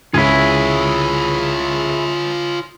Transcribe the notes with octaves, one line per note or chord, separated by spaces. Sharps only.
C#2 E4 F4 G#4 C#5